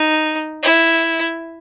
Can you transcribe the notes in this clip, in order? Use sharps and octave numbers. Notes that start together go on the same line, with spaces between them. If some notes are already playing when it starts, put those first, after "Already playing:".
Already playing: D#4
E4